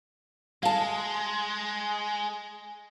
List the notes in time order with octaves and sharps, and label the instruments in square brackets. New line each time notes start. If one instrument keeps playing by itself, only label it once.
[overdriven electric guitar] G#3 [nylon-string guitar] F5 A5